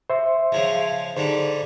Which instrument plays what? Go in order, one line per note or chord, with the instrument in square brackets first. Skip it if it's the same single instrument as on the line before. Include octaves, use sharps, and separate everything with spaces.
[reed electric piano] C5 E5 C6
[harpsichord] C#3 F3 G#3
[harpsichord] G#2 D3 G3 [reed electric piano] C5